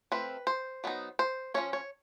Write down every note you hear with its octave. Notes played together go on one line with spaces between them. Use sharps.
F3 A3 C4 B4
C5
F#3 B3 D#4
C5
F3 A#3 C#4 C#5
C#5